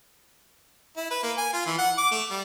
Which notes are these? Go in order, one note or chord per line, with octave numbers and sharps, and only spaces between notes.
E4
B4
A#3
G#5
F4
E3
F#5
D6
A3
G3